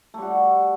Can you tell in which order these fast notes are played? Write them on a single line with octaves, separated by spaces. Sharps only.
A3 G3 F#4